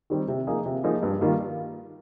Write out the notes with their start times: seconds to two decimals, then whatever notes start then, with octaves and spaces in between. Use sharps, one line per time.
0.10 D#3 G3 C4 G4
0.28 C3
0.47 F3 A#3 D#4 G#4
0.66 C3
0.84 F3 A#3 D#4 G#4
1.03 G2
1.21 D#3 G3 A#3 F4